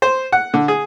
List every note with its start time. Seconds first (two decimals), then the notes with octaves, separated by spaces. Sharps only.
0.02 C5
0.32 F#5
0.54 D3
0.68 G#4